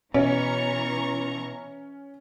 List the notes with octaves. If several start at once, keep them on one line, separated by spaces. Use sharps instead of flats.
B2 E3 C#4 A#5 C#6